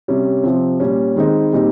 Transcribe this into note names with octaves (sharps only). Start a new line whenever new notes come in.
C3 G3 C#4
C3 F3 C4
A#2 G3 C#4
D#3 G#3 C4 D#4
A#2 G3 C4 D#4